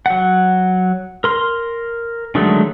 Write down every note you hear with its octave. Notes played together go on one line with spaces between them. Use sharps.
F#3 F#5
A#4 C6
D3 D#3 F#3 G#3 A3